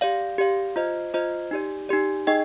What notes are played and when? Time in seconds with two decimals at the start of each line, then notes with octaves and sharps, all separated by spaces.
0.01 G4 D5 F5
0.38 G4 D5 F5
0.76 F4 C5 D#5
1.14 F4 C5 D#5
1.51 D#4 G4 D5
1.89 D#4 G4 D5
2.27 D#4 G#4 D#5 G5